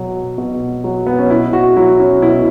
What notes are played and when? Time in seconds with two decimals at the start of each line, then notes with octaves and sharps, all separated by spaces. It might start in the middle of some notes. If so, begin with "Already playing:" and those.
Already playing: B2 F#3
0.38 B2
0.84 F#3
1.07 B3
1.19 C#4
1.30 B2 E4
1.53 F#4
1.76 F#3 E4
1.99 C#4
2.22 B2 E4